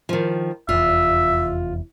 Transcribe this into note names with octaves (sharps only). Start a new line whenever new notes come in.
D#3 F3
F1 E2 F4 E5